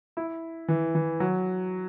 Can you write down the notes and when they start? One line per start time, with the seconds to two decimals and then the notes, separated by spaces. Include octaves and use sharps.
0.17 E4
0.68 E3
0.95 E3
1.20 F#3